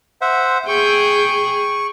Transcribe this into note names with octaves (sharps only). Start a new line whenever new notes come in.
C5 E5 F#5
G#4 G5 C#6